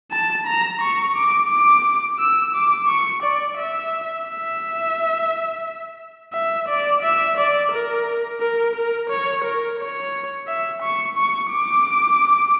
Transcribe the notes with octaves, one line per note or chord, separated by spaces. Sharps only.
A5
A#5
C#6
D6
D6
E6
D6
C#6
D5
E5
E5
E5
D5
E5
D5
A#4
A#4
A#4
C#5
A#4
C#5
E5
C#6
C#6
D6